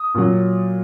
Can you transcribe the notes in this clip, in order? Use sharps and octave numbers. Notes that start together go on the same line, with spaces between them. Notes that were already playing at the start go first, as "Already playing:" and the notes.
Already playing: D#6
A#2 F#3